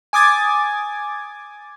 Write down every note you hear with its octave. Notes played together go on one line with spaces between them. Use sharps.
G#5 D6 D#6 G#6 A6